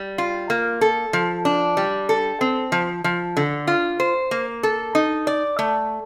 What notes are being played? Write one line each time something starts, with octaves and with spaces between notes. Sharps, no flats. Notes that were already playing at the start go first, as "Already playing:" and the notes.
Already playing: G3
F4
A#3
A4
F3
D4
G3
A4
C4
F3
F3
D3
F4
C5
A#3
A4
D#4
D5
A3